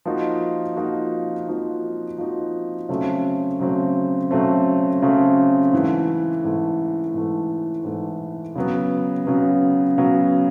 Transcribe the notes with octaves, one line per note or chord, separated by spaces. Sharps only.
F3 A#3 D#4 F#4
F3 A#3 D#4 F#4
F3 A#3 D#4 F#4
F3 A#3 D#4 F#4
C#3 F#3 A3 C4
C#3 F#3 A3 C4
C#3 F#3 A3 C4
C#3 F#3 A3 C4
G#2 E3 A3
G#2 E3 A3
G#2 E3 A3
G#2 E3 A3
C#3 F#3 B3
C#3 F#3 B3
C#3 F#3 B3